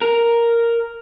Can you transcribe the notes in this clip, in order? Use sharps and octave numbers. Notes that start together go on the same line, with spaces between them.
A#4